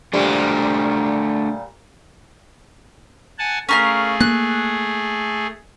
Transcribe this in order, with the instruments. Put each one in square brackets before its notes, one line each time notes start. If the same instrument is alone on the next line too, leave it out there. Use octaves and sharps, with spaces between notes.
[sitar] A#2 G3 [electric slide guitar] A3 D4 C5
[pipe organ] F#5 G#5 A5
[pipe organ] A3 G#4 [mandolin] C#4 A#4 F5
[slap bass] A#3 [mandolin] F#6